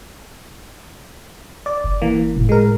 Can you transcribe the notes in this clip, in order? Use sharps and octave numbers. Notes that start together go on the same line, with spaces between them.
D5
F#1
E3 A#3
A2
G#3 A#4